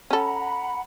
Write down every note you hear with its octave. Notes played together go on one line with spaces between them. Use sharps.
C#4 A4 F#5 A#5 B5